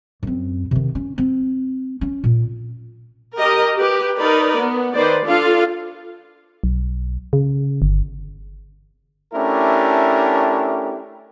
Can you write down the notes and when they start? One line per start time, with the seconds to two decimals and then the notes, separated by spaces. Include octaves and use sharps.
0.23 F#2 C4
0.71 C3 D#3
0.95 C#4
1.18 C4
2.01 C#4
2.24 A#2
3.38 G4 A#4 D#5
3.76 G4 B4
4.18 D#4 A#4 B4 D5
4.57 B3
4.94 D#3 B4 C5 D5
5.25 D4 F4 A4 F5
6.64 B1
7.33 C#3
7.82 G1
9.34 A3 C#4 D4 E4 G4 A#4